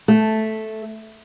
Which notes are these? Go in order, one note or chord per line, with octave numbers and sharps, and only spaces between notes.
A3